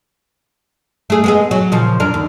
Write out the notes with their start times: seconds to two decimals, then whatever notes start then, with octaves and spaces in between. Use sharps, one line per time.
1.10 A3 G#4
1.24 G#3 B3 G#4
1.51 F#3
1.72 A#2 C#3 F3
2.00 F#2 D4 A#4
2.14 D#2